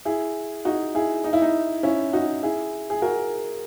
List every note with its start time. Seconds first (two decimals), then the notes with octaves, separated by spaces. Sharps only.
0.05 E4 G#4
0.65 D#4 F#4
0.95 E4 G#4
1.24 D#4
1.33 E4
1.42 D#4
1.83 C#4 E4
2.13 D#4 F#4
2.43 E4 G#4
2.90 G#4
3.02 F#4 A#4